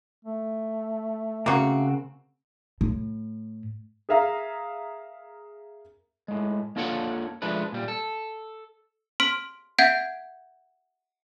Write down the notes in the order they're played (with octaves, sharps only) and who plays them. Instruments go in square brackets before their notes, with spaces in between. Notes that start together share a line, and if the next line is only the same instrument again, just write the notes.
[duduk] A3
[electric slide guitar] C#3 C4 [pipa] A#3 F#4
[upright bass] A2
[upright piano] G#4 A#4 E5 F5 A#5
[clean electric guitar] A2 G#3
A#3 D4 F4 A4 C#5 F#5
F3 G#3 A3 D4 B4
A#2 G3
A4
[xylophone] C6 F6 B6 D7
E5 F#5 G6 G#6 B6 D7